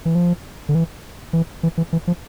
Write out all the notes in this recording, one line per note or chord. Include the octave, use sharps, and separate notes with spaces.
E3
F3
D3
E3
E3
E3
E3
E3
F3